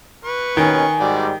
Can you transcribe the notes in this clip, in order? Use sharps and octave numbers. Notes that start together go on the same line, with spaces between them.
B4 C#6
D#2 B2 D#3 C#4 G#5
G#2 G3 F#4 G4 D5